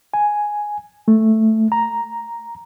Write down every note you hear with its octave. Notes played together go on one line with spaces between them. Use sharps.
G#5
A3
A#5